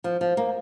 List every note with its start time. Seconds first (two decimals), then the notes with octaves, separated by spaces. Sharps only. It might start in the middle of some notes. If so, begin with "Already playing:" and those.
0.04 F3
0.21 F3
0.37 A#3